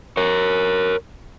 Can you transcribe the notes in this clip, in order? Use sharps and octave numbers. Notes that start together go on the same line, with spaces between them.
A#4 C#5